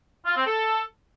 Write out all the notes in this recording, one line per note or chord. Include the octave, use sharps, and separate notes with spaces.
F4
C4
A4